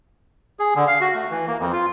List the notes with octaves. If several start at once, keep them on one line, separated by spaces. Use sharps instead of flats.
G#4
D3
F5
F#4
A3
E3
A#3
F2
F4